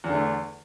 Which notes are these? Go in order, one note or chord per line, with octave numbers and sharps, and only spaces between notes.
E2 D3 A3